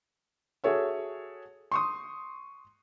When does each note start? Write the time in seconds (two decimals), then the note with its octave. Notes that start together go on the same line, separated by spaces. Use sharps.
0.64 F#4 G#4 A4 C#5 E5
1.72 C6 C#6 D#6